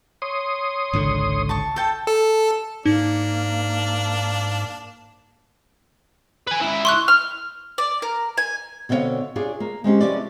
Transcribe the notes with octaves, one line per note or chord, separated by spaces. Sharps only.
C#5 C6 D#6
G#1 C#2 D3
A5 C#6
A4 G5 A5
A4
G#2 A#3 D4 D#4
B4 G#5
C#2 E4
C6 C#6 F#6
F6
D5
A#4
G#5
B2 D3 C4 F#4 C#5 F5
D4 F4 G#4 C#5 D5
A#3
G#3 C4 C#4 G4
C3 F3 C#4 E4 B4 D5